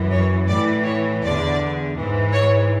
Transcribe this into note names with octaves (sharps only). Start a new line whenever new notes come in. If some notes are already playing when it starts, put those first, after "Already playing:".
Already playing: F#2 E3
C#5
A2 E3 D5
C#5
E2 D3 D5
G#2 E3
C#5